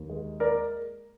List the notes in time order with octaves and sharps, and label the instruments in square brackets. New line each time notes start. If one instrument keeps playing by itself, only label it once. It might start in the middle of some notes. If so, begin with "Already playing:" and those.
Already playing: [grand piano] D#2
G#3
A#3 A#4 D5